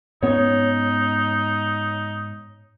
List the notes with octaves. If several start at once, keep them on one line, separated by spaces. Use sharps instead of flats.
G#2 B3 C#4 D#4 C#5